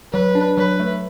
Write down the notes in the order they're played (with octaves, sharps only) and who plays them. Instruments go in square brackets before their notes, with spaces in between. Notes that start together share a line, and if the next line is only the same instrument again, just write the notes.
[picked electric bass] F#3 [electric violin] B4
[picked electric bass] D4
[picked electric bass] F#3 [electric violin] B4
[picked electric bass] A3